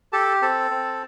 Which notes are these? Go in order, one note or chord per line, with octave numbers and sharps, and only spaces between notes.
G4 A4 A5
C4 A4 A5
C4